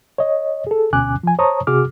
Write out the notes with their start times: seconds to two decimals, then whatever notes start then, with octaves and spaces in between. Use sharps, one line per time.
0.18 C#5 D#5
0.67 G#4 A4
0.93 D2 B2 C#4 G#5 D6 F#6
1.23 F3 G#5
1.39 C5 C#5 A5 A#5 C#6 D#6
1.67 C3 F#4 G#4 D6 F6